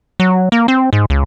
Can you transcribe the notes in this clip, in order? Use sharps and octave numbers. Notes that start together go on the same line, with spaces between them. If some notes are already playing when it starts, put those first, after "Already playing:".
F#3
A#3
C4
G#2
C#2